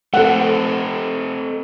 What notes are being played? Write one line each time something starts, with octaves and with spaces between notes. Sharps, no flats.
A3 C4 A4 F#5